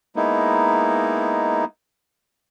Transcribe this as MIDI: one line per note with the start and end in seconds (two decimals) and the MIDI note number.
0.16 1.65 56
0.16 1.65 58
0.16 1.65 59
0.16 1.65 63
0.16 1.65 64